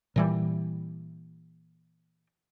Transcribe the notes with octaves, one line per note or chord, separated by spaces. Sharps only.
A#2 E3 G3